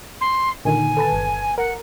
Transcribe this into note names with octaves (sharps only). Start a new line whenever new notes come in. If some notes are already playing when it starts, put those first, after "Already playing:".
C6
A#2 D3 D#3 G#5
A4 B4 A5
G1
A#4 F#5